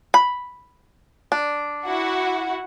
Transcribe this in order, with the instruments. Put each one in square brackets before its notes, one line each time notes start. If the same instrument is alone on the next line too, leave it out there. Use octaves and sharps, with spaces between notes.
[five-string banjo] B5
D4
[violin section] E4 F#4 F#5